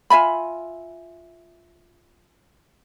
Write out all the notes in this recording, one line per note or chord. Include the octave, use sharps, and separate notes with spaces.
F4 E5 G#5 B5